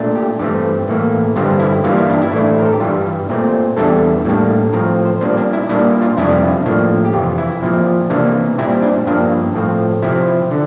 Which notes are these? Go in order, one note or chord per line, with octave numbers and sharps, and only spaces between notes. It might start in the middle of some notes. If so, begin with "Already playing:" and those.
Already playing: A#2 A3 D4
G4
G2 E3 A3 C4 G4
A2 E3 A#3
G2 D3 G3 C4 F4
E4
G2 E3 G3 A#3 F4
E4
D4
E4
A2 E3 A3 D4
C5
A#4
A4
G4
G2 E3 G3 F4
A#2 A3 C4
E2 E3 G3 D4 A4
A2 G3 A#3 D4
A2 F3 C4 A#4
C5
A#2 G3 A#3 D4 C5
D4
E4
A#2 G3 A#3 D4 E4
F4
F2 C3 G3 D4 E4
A2 F3 A#3 D4
G4
F2 C3 E3 F4
E4
A#2 F3 C4
C3 E3 A#3 D4
A#2 G3 C4 E4
D4
G2 F3 A#3 D4
A2 F3 C4
C3 F3 C4 E4
D3